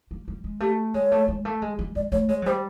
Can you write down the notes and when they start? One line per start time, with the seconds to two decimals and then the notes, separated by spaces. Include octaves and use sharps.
0.11 G3
0.28 G3
0.44 G#3
0.60 A3 G4
0.94 G#3 C#5
1.12 A3
1.28 G#3
1.45 A3
1.62 G#3
1.79 G3
1.95 G#3 D5
2.12 A3 C#5
2.29 G#3 C#5
2.42 F#3
2.46 G3 C5